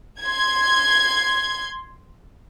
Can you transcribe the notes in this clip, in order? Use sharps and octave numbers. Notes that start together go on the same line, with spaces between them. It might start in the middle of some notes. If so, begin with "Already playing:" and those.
C6 G#6